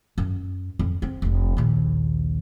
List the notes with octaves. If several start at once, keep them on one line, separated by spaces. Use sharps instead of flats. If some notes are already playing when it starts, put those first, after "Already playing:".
F#2
F2
C4
F1 D4
A#1 D#2